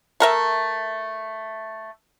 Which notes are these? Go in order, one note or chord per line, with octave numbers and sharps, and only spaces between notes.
A3 A#4 E5